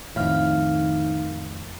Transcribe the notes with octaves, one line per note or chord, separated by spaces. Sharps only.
F2 A2 D#3 F5 F6